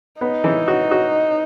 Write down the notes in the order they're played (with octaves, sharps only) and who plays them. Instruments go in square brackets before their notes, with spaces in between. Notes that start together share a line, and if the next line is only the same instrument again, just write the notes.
[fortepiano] B3 [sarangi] D#4
[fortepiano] E3
F#4
F#4